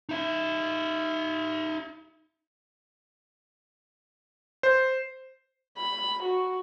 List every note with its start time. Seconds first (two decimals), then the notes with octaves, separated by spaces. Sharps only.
0.09 D#4 E5
4.63 C5
5.77 B5
6.23 F#4